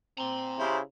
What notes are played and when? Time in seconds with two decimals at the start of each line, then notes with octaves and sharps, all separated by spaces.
0.18 C4 A#5 C6
0.59 C#3 E4 G4 C5